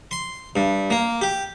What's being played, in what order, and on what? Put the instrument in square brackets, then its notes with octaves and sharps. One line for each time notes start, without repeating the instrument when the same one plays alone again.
[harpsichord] C6
G2
A#3
G4